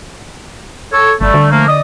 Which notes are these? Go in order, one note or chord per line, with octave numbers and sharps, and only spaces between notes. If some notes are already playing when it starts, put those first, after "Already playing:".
A4 C#5
G1 G3 A3
D3
F3 A3 A#3
D5 D#5 D#6